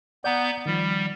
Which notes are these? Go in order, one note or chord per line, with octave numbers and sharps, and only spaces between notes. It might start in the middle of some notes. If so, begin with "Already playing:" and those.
B3 D5 F#5 A#5 G6
D#3 F3 G3